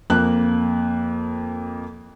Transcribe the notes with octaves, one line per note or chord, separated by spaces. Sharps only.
F2 A#3 F#6